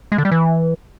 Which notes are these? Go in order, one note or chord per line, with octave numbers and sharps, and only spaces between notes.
G#3
D3
G3
E3